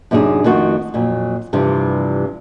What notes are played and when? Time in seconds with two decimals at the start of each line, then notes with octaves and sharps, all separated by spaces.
0.11 F#2 C3 D4 D#4 G#4
0.44 F2 D#3 A3 C4 F#4
0.94 F2 A#2 F#3
1.53 G2 C3 E3 F3 G3